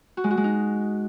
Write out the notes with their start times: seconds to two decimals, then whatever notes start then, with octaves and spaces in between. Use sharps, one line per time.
0.17 F#4
0.24 G#3
0.31 F#4
0.37 G#3
0.44 D#4